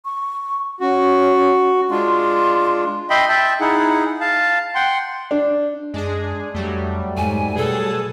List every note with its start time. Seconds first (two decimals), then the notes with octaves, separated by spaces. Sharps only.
0.05 C#6
0.81 C#4 F#4
1.90 G#3 D4 F4 C6
3.10 D#5 E5 G5 B5 C6
3.29 E5 G5 A5
3.61 D#4 E4 G#4 F#5
4.20 F5 A5
4.75 F#5 G5 C6
5.31 D4
5.94 F#2 G#3 D4 G#4
6.54 F2 F#3 G3 A3
7.17 F2 G#2 G#5
7.57 B2 G#4 A4 B4 A5